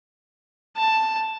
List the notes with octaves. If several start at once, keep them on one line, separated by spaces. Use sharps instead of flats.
A5